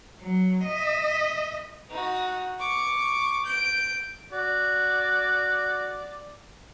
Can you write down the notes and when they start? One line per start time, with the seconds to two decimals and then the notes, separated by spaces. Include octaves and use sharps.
0.22 F#3
0.64 D#5 E5
1.91 D#4 F#4
2.59 C#6 D6
3.46 G6 D7
4.32 F#4 D5